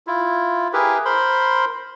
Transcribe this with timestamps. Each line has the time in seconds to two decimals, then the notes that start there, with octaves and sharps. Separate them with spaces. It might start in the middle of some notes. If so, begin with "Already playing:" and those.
0.07 E4 F4
0.73 E4 G4 G#4 A#4 B4
1.05 A#4 C5 B5 C6